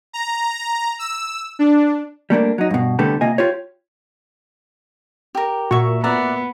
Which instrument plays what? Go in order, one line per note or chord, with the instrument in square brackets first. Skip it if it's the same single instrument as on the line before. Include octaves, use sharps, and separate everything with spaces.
[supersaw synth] A#5
E6
D4
[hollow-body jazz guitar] G3 A3 A#3 D4
F#3 D#4
G2 B2
C2 D3 A3 B3 G4 A4
C3 A#3 F4 D#5 G#5
F4 G4 C#5
[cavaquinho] G4 A#4
[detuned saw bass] A#2 [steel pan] F#4 C#6 [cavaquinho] A#4 E5
[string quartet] B3 [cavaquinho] D5 E5 F#5 [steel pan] A#5